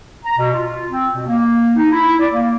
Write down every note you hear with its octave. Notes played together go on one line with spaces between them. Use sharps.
A#5
B2
F4
C4
B2
A#3
D#4
E4
D5
A#3